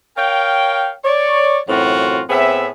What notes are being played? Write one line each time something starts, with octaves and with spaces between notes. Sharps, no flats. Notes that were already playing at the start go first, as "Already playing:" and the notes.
A#4 C#5 F5 G5
C#5 D5
F#2 A2 E3 C4 F4 F#4
A2 B3 C4 G#4 E5